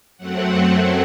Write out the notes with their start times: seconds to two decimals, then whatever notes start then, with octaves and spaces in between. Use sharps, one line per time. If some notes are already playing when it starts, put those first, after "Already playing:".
0.17 F#2 F#3 A3 C4 F#5
0.66 F#5